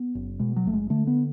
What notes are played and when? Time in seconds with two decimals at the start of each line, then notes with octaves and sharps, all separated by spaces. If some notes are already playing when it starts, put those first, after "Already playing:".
Already playing: B3
0.15 F#1
0.39 B2 G#3
0.56 F#3
0.65 F#1 A3
0.73 G#3
0.90 D3 A3
1.07 B3